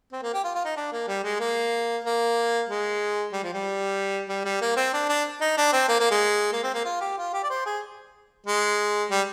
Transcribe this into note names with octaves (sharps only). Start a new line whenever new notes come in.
C4
A#3
G4
F4
F4
D#4
D4
A#3
G3
G#3
A#3
A#3
G#3
G3
F3
G3
G3
G3
A#3
C4
D4
D4
D#4
D4
C4
A#3
A#3
G#3
A#3
C4
A#3
F4
G4
F4
G4
D5
C5
G#4
G#3
G3